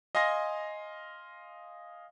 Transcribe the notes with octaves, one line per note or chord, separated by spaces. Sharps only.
D#5 F5 G#5 C6 A#6